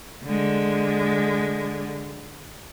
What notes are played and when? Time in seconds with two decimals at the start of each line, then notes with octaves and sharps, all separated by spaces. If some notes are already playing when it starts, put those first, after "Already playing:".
0.25 D3 G#3